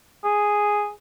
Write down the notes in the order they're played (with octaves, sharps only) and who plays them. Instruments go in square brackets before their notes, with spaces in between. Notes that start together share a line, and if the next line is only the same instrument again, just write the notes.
[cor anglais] G#4